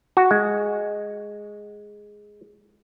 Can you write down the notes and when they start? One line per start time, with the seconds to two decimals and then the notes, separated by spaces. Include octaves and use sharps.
0.17 F#4
0.31 G#3